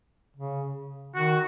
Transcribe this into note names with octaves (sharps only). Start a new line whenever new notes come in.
C#3
D#3 F#4